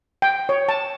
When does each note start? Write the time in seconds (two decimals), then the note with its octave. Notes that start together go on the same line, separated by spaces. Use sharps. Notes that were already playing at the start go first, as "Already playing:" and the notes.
0.22 G5
0.49 C#5
0.69 A5